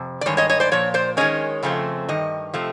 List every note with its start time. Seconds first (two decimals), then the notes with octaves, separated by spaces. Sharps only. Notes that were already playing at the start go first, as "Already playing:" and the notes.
Already playing: F2 C3
0.21 D5
0.26 G2 D#3 G#3 C#5
0.37 C#5 D#5
0.50 C#5 D#5
0.60 C5 D5
0.72 A#2 F3 C#5
0.94 C5 D5
1.17 D#3 G#3 C#4 C#5 D#5
1.63 F2 C#3 F3 A3 C4
2.08 G2 D#3 D#5
2.54 C3 F3 A3